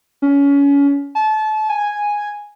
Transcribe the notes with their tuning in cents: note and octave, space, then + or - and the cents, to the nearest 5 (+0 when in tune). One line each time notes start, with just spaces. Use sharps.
C#4 +25
A5 -30
G#5 -5